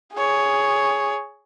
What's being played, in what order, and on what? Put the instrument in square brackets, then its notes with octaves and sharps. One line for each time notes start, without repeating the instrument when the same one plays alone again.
[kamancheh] G#4 C#5